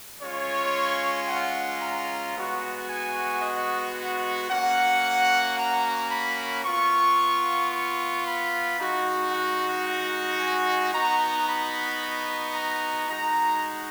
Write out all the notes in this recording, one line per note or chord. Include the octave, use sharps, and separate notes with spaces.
G#3 C#4 F4 C#5
F#5
A#5
G#3 B3 F#4
G#5
D#5
F#5
A#3 C#4 F#4 F#5
A#5
B5
B3 F4 C#6
C#6
B5
G#3 D#4 F#4
F#5
F#5
G#5
B3 D#4 F#4 A#5
B5
A#5
G#3 D#4 F#4 A#5